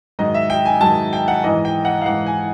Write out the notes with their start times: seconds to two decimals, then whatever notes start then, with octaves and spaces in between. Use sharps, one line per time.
0.19 G#2 D#3 F#3 D#5
0.34 E5
0.50 G5
0.66 G#5
0.81 G#2 D#3 F#3 A5
1.13 G5
1.28 F#5
1.44 G#2 E3 D#5
1.65 G5
1.85 F#5
2.01 F5
2.06 G#2 E3 F#5
2.26 G#5